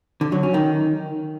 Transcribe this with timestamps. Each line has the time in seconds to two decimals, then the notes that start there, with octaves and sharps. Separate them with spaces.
0.21 D3
0.32 F#3
0.43 C#4
0.54 D#3